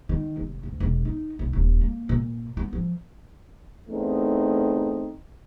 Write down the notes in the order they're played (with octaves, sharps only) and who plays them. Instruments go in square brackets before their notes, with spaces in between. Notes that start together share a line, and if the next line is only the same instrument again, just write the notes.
[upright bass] D#3
F1
D2
E1
D#4
B1
D#1
A#3
A#2
B3
F3
[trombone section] E2 A3 C4 D#4